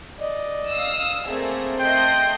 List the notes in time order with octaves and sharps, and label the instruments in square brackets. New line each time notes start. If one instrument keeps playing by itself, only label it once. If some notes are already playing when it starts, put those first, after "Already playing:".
[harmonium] D5 D#5
[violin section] F5 D#6 E6
[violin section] A3 A#3 G#4 [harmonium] C4
[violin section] A3 D#5 C6 [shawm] G5